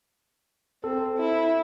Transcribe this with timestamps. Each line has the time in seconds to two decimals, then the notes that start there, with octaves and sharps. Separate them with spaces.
0.84 C4 A4
1.18 E4